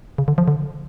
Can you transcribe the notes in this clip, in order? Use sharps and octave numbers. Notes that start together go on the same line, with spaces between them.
C#3
D3
F3
D3